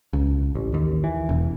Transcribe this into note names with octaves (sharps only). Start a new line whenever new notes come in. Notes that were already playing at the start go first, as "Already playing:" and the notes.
C#2
A1
D#2
E3
E1